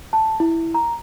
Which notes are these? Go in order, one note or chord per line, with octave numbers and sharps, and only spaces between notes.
A5
E4
A#5